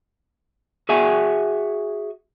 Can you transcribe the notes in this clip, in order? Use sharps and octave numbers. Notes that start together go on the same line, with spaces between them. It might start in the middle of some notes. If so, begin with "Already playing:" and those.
F#4 G#4 E5 F#5 G#5